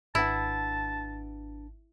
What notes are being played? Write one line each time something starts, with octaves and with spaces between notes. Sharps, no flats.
G#1 D4 E4 B4 F#5 A5